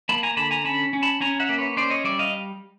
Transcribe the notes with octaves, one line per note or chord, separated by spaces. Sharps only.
A#3 A5 B5
G#5 A#5
D3 A5 B5
G#5 A#5
C#4 A5 B5
C#4
A5 B5
C#4 G#5 A#5
E5 F#5
A#3
B4 C#5
C#4 C5 D5
C#5 D#5
G3 D5 E5
D#5 F5